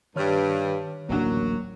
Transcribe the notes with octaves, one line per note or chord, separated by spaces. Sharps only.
G2 D#3 C#5 F6
D1 A1 F#3 A#3 D4